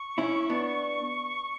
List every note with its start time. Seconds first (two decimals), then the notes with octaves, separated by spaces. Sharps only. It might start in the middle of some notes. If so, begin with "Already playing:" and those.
Already playing: C#6
0.18 C#4 E4
0.49 B3 D4